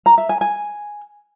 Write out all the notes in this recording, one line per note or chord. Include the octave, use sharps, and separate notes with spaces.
A#5
E5
G#5
G#5